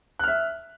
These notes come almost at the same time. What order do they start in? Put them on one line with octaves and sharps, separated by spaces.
F#6 F6 E5